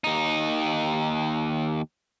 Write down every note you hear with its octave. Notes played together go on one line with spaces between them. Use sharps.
D#2 D#4